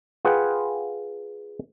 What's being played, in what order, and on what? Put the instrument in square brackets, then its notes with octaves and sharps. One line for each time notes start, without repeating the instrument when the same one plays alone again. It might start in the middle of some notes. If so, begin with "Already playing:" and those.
[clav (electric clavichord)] F4 G#4 B4 F#5 G5